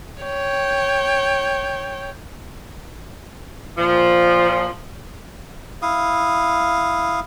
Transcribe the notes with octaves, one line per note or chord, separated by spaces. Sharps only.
C#5 G5
A#2 F3
E4 F5 D#6